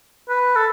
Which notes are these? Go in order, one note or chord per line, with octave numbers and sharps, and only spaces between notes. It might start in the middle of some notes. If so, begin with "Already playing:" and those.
B4
A4